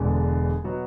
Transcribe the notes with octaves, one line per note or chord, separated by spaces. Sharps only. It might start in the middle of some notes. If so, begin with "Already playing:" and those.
Already playing: E1 E2 D3 G#3
B2 F#3 B3 F#4